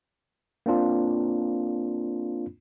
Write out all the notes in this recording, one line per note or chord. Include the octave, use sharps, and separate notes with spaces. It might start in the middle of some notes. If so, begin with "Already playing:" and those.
A#3 C4 D4 F4